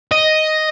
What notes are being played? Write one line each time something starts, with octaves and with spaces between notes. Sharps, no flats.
D#5